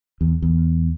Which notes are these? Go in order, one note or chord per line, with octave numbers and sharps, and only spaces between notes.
E2
E2